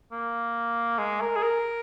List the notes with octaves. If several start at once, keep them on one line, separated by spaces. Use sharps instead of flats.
A#3
G#3
A#4
G#4
A#4